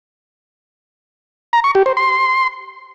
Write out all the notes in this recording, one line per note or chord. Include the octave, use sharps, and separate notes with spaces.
A#5
C#6
G4
C5
C6